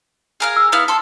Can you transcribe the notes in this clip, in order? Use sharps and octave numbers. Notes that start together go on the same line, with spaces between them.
G#4 A#4 F5
E6
B3 E4 F5
A4 C6